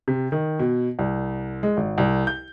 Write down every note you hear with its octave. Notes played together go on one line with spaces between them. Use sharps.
C3
D#3
B2
C2
G#3
G#1
C2
G6